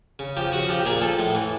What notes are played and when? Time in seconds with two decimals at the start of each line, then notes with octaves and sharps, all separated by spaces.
0.19 C#3
0.37 F3 G4
0.52 C#3 F#4
0.69 F3 G4
0.79 G4
0.86 A#2 G#4
1.01 F3 A4
1.19 A2
1.35 E3